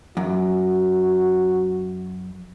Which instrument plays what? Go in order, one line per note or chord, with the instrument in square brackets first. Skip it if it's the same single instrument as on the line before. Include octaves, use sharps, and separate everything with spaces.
[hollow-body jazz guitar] F#2 [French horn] F#4